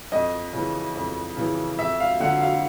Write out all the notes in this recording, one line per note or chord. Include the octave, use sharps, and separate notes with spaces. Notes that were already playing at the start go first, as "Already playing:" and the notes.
F2 D#5
C#3 E3
F2
C#3 E3
F2 E5
F5
D3 F#3 F#5
F5